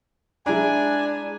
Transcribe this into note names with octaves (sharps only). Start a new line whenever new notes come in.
G#3 D4 E4 G#5 A#5